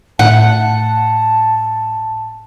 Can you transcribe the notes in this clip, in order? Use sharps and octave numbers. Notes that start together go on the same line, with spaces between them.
A2 F#5 A5